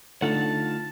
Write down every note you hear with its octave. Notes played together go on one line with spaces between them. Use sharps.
D3 A3 D#4 F4 F#5 A5